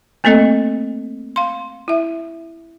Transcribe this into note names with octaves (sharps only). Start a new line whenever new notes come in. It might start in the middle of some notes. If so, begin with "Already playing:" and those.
A3 A#3 C4 A4 D#5
F5 C6
E4 E5